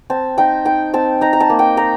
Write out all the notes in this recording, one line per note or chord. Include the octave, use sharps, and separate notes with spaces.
C4 A5
D#4 G5
D#4 G5
C4 A5
D#4 A#5
A#5
A5
A#3
G5
D#4 A#5